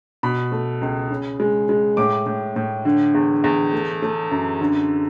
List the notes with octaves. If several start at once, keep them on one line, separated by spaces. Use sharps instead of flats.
B2 B5
A3
C#2
C#3
G#3
G#3
A2 D6
A2
A2
D3
E2
E2
A3
A3
F#2
D3